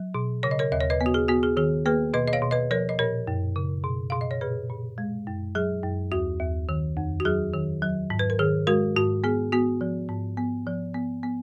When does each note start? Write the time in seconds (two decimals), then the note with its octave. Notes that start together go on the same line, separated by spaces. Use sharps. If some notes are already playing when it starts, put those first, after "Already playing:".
Already playing: F#3
0.14 B2
0.43 C#3 C#5
0.51 D#5
0.59 A#4 C#5
0.72 D#2 D#5
0.81 C#5
0.90 B4 D#5
1.01 B3
1.06 F#4
1.14 G#4
1.28 B3 F#4
1.43 G#4
1.57 D#3 G#4
1.86 A#3 G#4 B4
2.14 B2 B4 D#5
2.28 D#5
2.33 C#5 F5
2.42 B2
2.51 B4 D#5
2.71 F3 A#4 C#5
2.89 D#5
2.99 A#2 A#4 C#5
3.27 F#2
3.56 C#3
3.84 B2
4.10 B2 F5
4.21 D#5
4.31 C#5
4.41 A#2 G#4 B4
4.70 A#2
4.98 G#3
5.27 F#2
5.55 F#3 G#4
5.83 F#2
6.12 D#2 F#4
6.40 D#2
6.69 D#3
6.97 F2
7.20 F#4
7.25 F#3 G#4
7.54 D#3
7.82 F#3
8.10 G#2
8.19 B4
8.30 A#4
8.39 D#3 G#4
8.67 G#3 F#4 A#4
8.96 G#2 F#4
9.24 B3 G#4
9.52 B3 F#4
9.81 F3
10.09 G#2
10.37 B3
10.67 F3
10.94 B3
11.23 B3